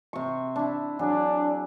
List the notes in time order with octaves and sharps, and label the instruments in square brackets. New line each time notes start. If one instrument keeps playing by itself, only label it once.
[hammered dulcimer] C3 C#6
D4 E4
[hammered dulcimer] F#3 G#4 [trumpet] D4